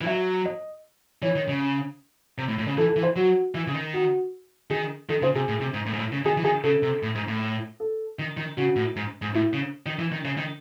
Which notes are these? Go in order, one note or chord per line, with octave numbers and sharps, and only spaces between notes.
E3
F#3 E5
D#5
E3 C#5
D#3
C#3
C3
A2
A2
C#3
E3 A4
A4
E3
C5
F#3 F#4
E3
C#3
D#3
F#4
D#3 G#4
D#3 A4
C#3 C5
C3 G#4
A2
C3
G#2
A2
G#2
A2
C#3
D#3 G#4
E3
D#3 G#4
C#3 A4
C3
A2
G#2
A2
A4
D#3
D#3
C#3 F#4
A2
G#2
G#2
A2 E4
C#3
D#3
E3
D#3
C#3
D#3